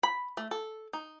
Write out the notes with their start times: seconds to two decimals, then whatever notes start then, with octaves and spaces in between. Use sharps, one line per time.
0.03 B5
0.37 A3
0.51 A4
0.93 D#4